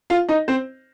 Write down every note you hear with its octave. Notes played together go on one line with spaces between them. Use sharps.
F4 F5
D#4 D#5
C4 C5